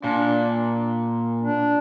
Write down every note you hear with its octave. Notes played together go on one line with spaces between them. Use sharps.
A#2 D4
D4